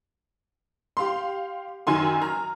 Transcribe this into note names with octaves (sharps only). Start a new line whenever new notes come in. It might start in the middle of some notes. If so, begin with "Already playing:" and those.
G4 F5 C6
F#2 D#3 G#5 C6
A#5 F6